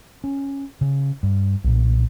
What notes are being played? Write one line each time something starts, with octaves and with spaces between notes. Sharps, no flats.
C#4
C#3
G2
B1 A#2